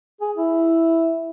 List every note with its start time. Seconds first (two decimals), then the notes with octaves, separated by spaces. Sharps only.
0.21 G#4
0.37 E4